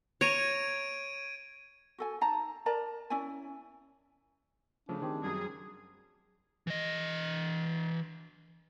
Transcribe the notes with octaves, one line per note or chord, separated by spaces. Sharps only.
C#5 A#5 G#6 D7 D#7
F#4 A4 G#5
D#4 A5 A#5
A#4 D5 A5 A#5
C#4 E4 D5 G#5
C#3 F3 A3 D4
D#3 C4 G4 G#4
F#2 F#3 G3 G#4
E3 D#5